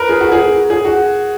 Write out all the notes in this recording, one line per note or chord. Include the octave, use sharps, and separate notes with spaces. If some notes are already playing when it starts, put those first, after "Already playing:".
Already playing: A#4 B4
G#4
F#4
G#4
G#4
F#4